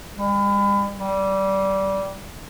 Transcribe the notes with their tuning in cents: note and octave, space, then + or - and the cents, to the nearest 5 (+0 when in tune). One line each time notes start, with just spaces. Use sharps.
G3 +45
G3 -20